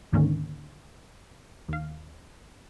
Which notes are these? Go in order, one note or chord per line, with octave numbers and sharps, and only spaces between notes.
D2 G#2 D3 D#3 A#3 C#4
D#2 F5